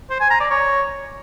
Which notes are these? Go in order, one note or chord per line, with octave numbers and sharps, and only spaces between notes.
C5
G#5
A#5
D5
C#5